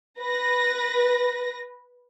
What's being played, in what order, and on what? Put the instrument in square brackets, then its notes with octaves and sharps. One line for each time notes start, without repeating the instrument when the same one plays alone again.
[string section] B4 A#6